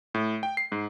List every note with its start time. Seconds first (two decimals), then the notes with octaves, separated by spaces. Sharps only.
0.14 A2
0.43 G5
0.57 C7
0.72 G#2